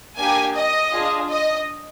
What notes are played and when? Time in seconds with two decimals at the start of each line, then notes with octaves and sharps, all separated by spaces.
0.17 A#3 D4 G4 G#5
0.54 D#5
0.92 D4 F4 G#4
1.30 D#5